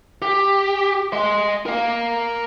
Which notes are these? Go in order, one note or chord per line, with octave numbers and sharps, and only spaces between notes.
G4
D#5 C6
A#4 F5